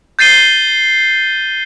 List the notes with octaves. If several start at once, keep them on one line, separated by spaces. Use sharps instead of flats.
G6 A6 C7 D#7 G7